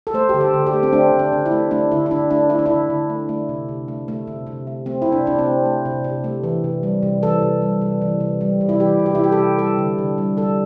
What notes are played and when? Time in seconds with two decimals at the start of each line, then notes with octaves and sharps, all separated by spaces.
0.07 A4
0.14 A3 C5
0.29 G4
0.34 D3
0.41 A4
0.54 D3
0.67 G4
0.73 A3
0.83 C4
0.93 A3 D4
1.12 D3
1.19 D4
1.33 D3
1.46 E4
1.51 A3
1.71 A3 D4
1.91 D3 E4
2.06 E4
2.11 D3 D4
2.30 A3 D4
2.50 A3 E4
2.59 D4
2.66 D3 E4
2.90 D3
3.10 A3
3.29 A3
3.49 C3
3.69 C3
3.88 A3
4.08 A3
4.27 C3
4.47 C3
4.67 A3
4.86 A3 C4
5.02 C3 E4
5.12 D4
5.25 C3 D4
5.39 C4
5.45 A3
5.66 A3
5.85 C3
6.04 C3
6.24 A3
6.43 E3
6.64 C3
6.83 G3
7.02 C3
7.22 E3 A4
7.42 C3
7.62 G3
7.82 C3
8.01 E3
8.20 C3
8.41 G3
8.61 C3
8.69 E4
8.80 E3 G4
8.99 C3
9.06 G4
9.15 E4
9.19 G3 G4
9.32 A4
9.39 C3
9.59 G3 A4
9.78 D3
9.98 D3
10.18 G3
10.37 G3 A4